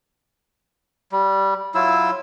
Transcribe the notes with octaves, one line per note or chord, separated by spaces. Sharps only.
G3
F#3 E4 F4 E6